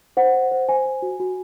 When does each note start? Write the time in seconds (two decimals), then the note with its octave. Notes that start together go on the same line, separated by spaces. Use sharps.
0.17 C5 F#5
0.34 C5
0.51 C5
0.68 C5 G#5
0.85 C5
1.02 F#4
1.20 F#4